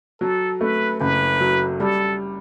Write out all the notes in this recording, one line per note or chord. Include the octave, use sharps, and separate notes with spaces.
F#3 A4
A3 B4
F#1 B4
F#3
G3 A4